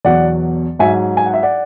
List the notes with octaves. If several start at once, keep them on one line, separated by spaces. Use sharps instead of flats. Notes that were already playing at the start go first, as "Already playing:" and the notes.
E2 B2 F#3 D5 F#5
G#2 F#3 E5 G#5
G#5
F#5
E5
D5 F#5